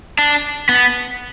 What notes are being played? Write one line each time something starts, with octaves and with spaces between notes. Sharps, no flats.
D4
B3